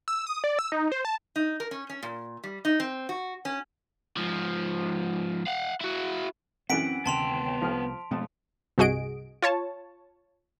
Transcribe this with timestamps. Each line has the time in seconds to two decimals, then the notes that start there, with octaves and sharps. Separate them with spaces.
0.08 E6
0.27 D#6
0.44 D5
0.59 E6
0.72 D#4
0.92 C5
1.05 A5
1.36 D#4
1.60 A#4
1.71 C#4
1.90 C#4
2.03 A#2
2.44 G3
2.65 D#4
2.80 C4
3.09 F#4
3.45 C#4
4.17 G#2 F3
5.47 F5 F#5
5.81 E4 F#4
6.70 F#2 E3 C4 F#5 B6 D7
7.06 D2 C3 D#3 B3 G5 A5 C6 F7
7.62 C2 F3 F6
8.11 F2 B2 G#3 A3 A5
8.78 C2 G2 F#4 G#4 D#5 D7
9.42 F4 C#5 A5